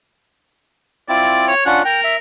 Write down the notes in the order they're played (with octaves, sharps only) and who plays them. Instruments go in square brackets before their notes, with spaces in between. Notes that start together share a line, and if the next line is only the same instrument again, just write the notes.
[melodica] C4 E4 F4 [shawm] D5
[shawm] C#5
[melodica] C#4 D4 F4 [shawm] F#5
[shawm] A#4 [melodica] G5
[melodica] E5